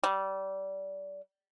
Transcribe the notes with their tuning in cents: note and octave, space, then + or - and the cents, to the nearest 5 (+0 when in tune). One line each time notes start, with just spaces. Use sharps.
G3 -25